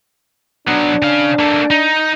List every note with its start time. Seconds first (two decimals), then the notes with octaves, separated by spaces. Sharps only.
0.67 F#3 B3 D4
1.03 C#3 F5
1.39 A3 A#3
1.71 D#4